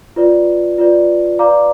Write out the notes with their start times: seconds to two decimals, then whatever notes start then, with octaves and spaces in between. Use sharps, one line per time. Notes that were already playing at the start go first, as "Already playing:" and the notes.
0.16 F4 B4 D5
0.78 F4 B4 D5
1.39 B4 D5 F5 A#5 D6